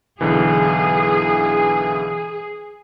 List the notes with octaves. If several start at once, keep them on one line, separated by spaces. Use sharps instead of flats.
B1 D3 E3 G#4